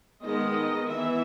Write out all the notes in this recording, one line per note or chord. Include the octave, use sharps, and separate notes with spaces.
D#3 G#3 B3 D#5
E3 B3 E5